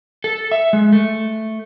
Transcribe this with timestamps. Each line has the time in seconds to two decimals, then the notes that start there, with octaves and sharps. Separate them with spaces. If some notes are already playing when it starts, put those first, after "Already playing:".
0.24 A4
0.52 E5
0.73 G#3
0.93 A3